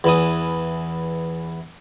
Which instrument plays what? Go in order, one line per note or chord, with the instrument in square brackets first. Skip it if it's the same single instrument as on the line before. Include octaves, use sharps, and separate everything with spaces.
[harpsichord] E2 E3 D#6